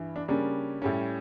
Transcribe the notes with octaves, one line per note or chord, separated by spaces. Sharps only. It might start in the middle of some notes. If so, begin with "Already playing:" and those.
Already playing: G2 E3
D4
C#3 G3 A#3 C#4 D4
A2 G3 C#4